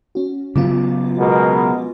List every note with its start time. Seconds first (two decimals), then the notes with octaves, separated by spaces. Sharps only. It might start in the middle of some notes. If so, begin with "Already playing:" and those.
0.15 C#4 F#4
0.56 C#3 F#3 B3 F4 D6
1.18 B2 G#3 A#4